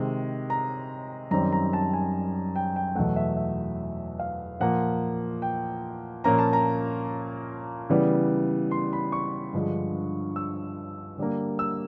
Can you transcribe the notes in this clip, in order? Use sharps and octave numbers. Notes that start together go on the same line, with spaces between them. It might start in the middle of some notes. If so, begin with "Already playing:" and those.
Already playing: C3 D#3 G#3
A#5
F#2 D#3 G3 C4 A#5
A#5
A5
G#5
G5
G5
E2 B2 F#3 A3 F#5
E5
E5
F5
A#2 F3 A#3 F#5
G5
A#2 F3 A#3 C#4 A#5
A5
A#5
C#3 E3 G3 B3
C6
B5
C#6
G2 D3 F3 G#3
E6
D3 G3 A#3
E6